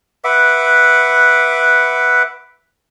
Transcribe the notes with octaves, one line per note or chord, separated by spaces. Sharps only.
B4 E5 F#5 D6